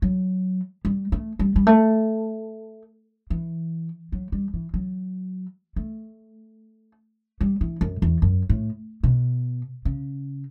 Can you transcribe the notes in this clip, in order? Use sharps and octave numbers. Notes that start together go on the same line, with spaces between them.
F#3
G3
A3
G3
G3
A3
E3
F#3
G3
E3
F#3
A3
G3
E3
F#2
E2
F#2
A2
B2
C#3